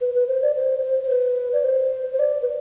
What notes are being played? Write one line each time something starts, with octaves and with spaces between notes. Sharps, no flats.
B4
B4
C5
D5
C5
C5
C5
B4
D5
C5
C5
D5
B4